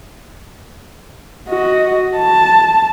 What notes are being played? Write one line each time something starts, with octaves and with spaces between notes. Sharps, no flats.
F#4 D#5
A5